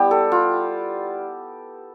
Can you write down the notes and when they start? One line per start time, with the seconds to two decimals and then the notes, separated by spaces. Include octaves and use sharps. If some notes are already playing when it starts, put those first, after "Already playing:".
Already playing: G3 B3 E4 G4
0.11 A4
0.32 F4